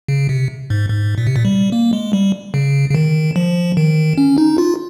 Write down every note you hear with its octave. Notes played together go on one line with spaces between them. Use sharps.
C#3
C3
G#2
G#2
A#2
C3
A#2
G3
A#3
G#3
G3
C#3
C#3
D#3
F3
D#3
C#4
D#4
F4